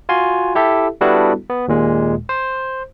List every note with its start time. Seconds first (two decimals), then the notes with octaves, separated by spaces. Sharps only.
0.09 F4 F#4 G#5 C6
0.55 E4 G4 A4 E5
1.01 G3 B3 D4 E4 F#4 A4
1.50 B3
1.68 D#2 A#2 G#3
2.29 C5